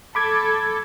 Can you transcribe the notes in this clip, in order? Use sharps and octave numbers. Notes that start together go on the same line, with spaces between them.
A4 B5 D6 G#6